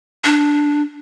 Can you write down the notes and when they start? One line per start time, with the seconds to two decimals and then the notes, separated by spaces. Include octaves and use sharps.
0.24 D4